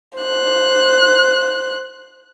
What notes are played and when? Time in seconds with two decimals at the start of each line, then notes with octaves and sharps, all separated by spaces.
0.19 C5 F#6